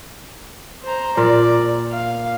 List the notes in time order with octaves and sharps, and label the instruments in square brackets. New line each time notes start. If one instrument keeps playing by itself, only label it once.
[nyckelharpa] C5 A#5
[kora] A#2 A#4 [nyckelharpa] D5
[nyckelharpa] F5